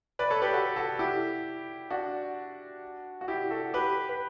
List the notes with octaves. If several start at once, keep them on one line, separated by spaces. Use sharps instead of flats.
B4 D5
A4 C#5
G4 B4
F#4 A4
F#4 A4
E4 G4
D4 F#4
F#4
E4 G4
F#4 A4
G4 B4
B4